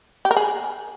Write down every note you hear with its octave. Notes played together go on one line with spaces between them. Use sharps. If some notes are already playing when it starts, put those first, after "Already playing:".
G4
A#4
G#4